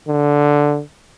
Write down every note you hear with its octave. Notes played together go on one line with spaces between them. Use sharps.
D3